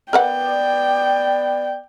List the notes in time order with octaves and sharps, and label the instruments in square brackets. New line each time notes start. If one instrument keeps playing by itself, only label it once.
[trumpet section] B3 D5 [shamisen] A#4 B4 F#5 [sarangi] G5